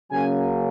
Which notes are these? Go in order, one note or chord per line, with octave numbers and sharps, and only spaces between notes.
C#3 F#3 A#3 C#4 G#5